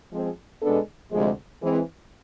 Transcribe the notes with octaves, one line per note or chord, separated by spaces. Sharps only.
F3 G#3 C4 G#4
B2 G#3 B3 D4 A4
D2 C3 F3 G#3
E3 G#3 C4